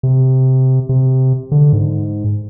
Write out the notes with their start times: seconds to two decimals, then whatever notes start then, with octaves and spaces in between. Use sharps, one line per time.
0.03 C3
0.89 C3
1.52 D3
1.73 G#2